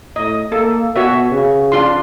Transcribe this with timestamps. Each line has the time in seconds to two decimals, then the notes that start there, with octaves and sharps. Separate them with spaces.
0.16 A2 D#5
0.52 A#3 A4
0.96 B2 F#4 C#5 E5
1.31 C#3
1.72 D4 F4 C6